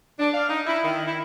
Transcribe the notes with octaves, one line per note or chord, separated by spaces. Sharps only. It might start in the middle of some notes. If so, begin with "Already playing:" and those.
D4
F5
D#4
E4
D#3
E4